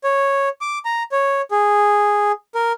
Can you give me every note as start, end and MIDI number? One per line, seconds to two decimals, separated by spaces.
0.04 0.49 73
0.61 0.79 86
0.85 1.03 82
1.12 1.41 73
1.51 2.32 68
2.55 2.72 70